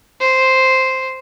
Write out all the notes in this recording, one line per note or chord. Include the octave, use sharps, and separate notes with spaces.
C5